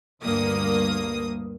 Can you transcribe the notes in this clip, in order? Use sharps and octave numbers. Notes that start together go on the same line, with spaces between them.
D2 G2 A#3 D#6